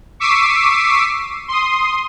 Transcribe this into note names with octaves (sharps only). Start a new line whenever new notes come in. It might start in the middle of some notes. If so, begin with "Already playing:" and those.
C#6 D6 E6 B6 C7 D#7
C6 D#6